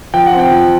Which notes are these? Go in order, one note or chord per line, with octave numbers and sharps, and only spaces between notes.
F3 G5
F#5
C4
G5
F3